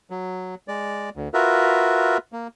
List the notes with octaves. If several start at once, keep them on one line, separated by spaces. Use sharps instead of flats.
F#3
G#3 D5
D2
F4 F#4 A#4 B4 E5
A#3